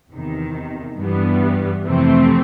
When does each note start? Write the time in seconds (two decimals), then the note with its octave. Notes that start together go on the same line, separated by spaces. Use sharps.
0.10 E2 C3 D#3
0.98 G2 E3 G3 B3
1.86 F2 C3 E3 A3 C4